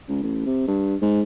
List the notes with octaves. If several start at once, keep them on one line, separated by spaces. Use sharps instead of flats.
C#2
A1
C3
G2
G#2